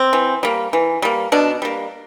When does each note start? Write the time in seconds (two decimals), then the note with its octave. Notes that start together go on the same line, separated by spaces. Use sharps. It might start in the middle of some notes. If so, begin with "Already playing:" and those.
Already playing: C4
0.13 E3
0.43 G3 A#3
0.73 E3
1.02 G3 A#3
1.32 B2 D4
1.62 G3 A#3